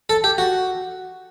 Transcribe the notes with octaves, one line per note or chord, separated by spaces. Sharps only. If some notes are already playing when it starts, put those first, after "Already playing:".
A4
G4
F#4